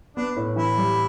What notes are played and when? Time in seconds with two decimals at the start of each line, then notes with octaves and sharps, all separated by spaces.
0.16 B3 D4
0.36 A2
0.56 E3 E4
0.78 G3